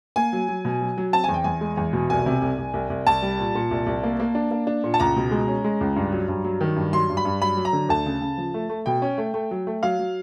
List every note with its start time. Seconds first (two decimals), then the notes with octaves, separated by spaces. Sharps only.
0.16 A#3 G#5
0.33 F#3
0.49 F#3
0.65 B2
0.82 F#3
0.98 F#3
1.13 C4 A5
1.24 E2 G#5
1.34 G5
1.44 E2 G#5
1.61 G#3
1.77 E2
1.93 B2
2.09 C2 G#5
2.26 C3
2.42 C2
2.58 C2
2.74 C2
2.90 C2
3.07 C2 A5
3.22 G3
3.39 A#2
3.55 A#2
3.71 C2
3.86 C2
4.03 A#3
4.20 A#3
4.35 D4
4.51 A#3
4.67 D4
4.84 A#2
4.94 A5
5.00 C#2 A#5
5.16 B2
5.31 G#3
5.48 C#4
5.64 G#3
5.81 C#2
5.96 G2
6.12 F#3
6.28 G2
6.45 F#3
6.61 D#3
6.76 G2
6.93 F#3 C6
7.10 G2
7.17 B5
7.25 G2
7.42 F#3 B5
7.57 F#3
7.65 A#5
7.73 D3
7.89 D2 A5
8.06 C#3
8.21 C#3
8.38 F3
8.54 A3
8.69 A3
8.86 B2 G5
9.02 C#4
9.18 A3
9.34 A3
9.51 F#3
9.67 A3
9.83 F#3 F5
9.99 F#3